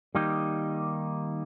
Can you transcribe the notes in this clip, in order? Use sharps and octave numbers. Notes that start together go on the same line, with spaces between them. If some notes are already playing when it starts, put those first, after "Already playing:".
D#3 G3 A#3 D#4 G4